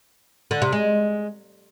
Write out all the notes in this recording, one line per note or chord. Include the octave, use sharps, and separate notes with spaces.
D3
C3
G#3